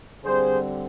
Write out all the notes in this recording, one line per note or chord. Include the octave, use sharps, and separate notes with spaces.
D3 G3 C4 G#4 C5